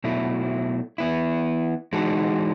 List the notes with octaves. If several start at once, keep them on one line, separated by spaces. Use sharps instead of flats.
B2 F#3 A3 E4
E3 B3 E4
E3 G#3 D#4 F#4 A4